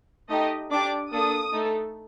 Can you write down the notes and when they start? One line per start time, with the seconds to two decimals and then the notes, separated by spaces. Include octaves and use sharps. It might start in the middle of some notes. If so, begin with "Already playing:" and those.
0.30 A3 D#4 G4 D#5
0.71 D4 G4 D6
1.12 A#3 D4 A4 D#6
1.54 A3 D#4 A4